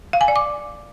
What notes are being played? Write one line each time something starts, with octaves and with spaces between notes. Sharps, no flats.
F5
G#5
D5
D6